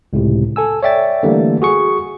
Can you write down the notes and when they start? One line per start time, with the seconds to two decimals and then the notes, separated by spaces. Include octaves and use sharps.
0.13 C#2 A2 C3
0.56 A4 G#5 E6
0.83 C#5 D5 E5 G5 A6
1.23 D3 E3 G3 A3 A#3
1.62 F#4 G#4 C#6